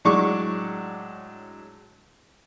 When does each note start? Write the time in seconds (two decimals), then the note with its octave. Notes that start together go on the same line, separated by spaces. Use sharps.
0.05 A2 F#3 G#3 D4 C#6 D6